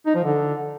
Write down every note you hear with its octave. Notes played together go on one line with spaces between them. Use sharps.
D#4
F3
D3